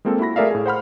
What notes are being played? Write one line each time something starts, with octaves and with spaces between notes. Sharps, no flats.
G#3 A#3 C4 F4 A4
E4 F#4 B5 A#6
A3 G#4 A#4 D5 E5 F5
A2 G#4
C5 F#5 B5 F6